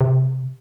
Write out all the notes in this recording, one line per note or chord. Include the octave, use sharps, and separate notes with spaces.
C3